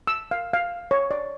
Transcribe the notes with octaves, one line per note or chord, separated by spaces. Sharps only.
E6
F5
F5
C#5
D5